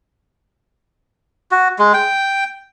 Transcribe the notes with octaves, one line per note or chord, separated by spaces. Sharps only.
F#4
G#3
G5